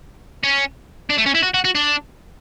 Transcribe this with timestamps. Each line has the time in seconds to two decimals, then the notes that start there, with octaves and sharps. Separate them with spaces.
0.43 C#4
1.10 D4
1.18 A3
1.26 C#4
1.34 E4
1.43 F#4
1.54 F#4
1.65 F#4
1.75 D4